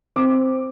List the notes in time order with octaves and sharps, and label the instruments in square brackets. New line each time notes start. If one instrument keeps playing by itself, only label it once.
[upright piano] C4 D6